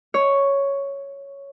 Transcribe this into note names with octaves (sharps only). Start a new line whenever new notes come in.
C#5